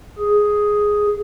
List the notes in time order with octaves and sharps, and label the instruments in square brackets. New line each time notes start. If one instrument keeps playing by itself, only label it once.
[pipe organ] G#4